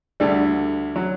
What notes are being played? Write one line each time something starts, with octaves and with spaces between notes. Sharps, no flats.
D2 D3 G3
F#3